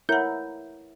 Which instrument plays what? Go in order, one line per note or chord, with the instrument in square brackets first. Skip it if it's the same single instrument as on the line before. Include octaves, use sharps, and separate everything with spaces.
[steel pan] E4 A#4 [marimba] C#5 F#5 [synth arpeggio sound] G6